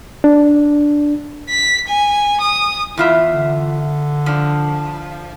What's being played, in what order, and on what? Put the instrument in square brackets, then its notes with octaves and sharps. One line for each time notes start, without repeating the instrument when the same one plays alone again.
[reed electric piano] D4
[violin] B6
G#5
D#6
[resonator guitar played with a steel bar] E2 F4 E5 [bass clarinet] E4
[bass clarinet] D3
[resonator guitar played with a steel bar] F3 D4